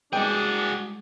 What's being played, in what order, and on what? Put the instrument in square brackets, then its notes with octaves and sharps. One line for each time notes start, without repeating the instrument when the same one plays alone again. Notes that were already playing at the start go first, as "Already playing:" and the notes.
[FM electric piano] G3 G#3 [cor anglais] D4 [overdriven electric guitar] F#4 G#4 [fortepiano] G5